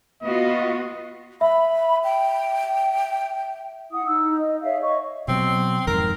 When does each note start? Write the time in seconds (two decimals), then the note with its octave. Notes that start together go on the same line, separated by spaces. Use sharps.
0.23 B3 F4 F#4 D#5
1.41 E5 B5
2.04 G5
3.92 E4 F#5 D#6
4.06 D#4 E6
4.37 D#5
4.63 G#4 C#5 E5 F5
4.81 C#5 D#5 C#6
5.28 B2 F#3 C4
5.87 F2 G#2 D#3 A#4